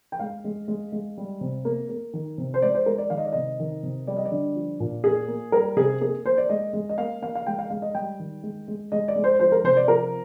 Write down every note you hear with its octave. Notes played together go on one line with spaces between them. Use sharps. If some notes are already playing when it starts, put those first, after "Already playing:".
G5
G#3 F5
G#3
G#3
G#3
G3
C3
A#3
A#3
D#3
C3
C5
G#3 D5
C5
G#3 A#4
D5
D#3 F5
D#5
D5
C3 D#5
D#3
C3
G3 D5
D#5
D5
D3
F3
A#2
A#3 G#4
A#3
G3 A#4
C3 G#4
A#3 G#4
A#3 C5
D5
G#3 D#5
G#3
D#5
A#3 F5
A#3 F5
F5
G#3 G5
F5
G#3 F5
D#5
G3 G5
D#3
G#3
G#3
G#3 D#5
D5
G#3
C5
F3 C5
A#4
C3 C5
D5
F3 A#4